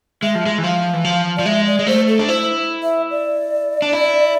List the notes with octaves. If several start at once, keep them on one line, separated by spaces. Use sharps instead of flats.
G#3 E5
F3
G#3
E3
F3 F5
E3
F3
F3 D5
G#3 E5
D5
G#3
A3 C5
A4
D4
E4 C5
E5
D5
D4
E4